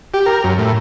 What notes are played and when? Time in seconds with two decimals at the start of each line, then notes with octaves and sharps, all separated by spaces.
0.14 G4
0.26 A#4
0.44 F#2
0.58 A2